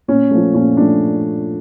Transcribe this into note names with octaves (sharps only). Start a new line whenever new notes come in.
A#2 C#4
F3 A3
A#2 C#4
F3 A3 D4